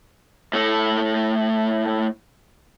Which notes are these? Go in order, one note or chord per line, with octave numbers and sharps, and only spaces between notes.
A2 A3